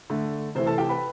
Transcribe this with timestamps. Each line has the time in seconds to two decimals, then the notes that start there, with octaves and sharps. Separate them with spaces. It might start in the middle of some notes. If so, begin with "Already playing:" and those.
0.10 D3 A3
0.55 C3 E3 A3 C4 C5
0.66 A4 A5
0.78 G4 G5
0.89 B4 B5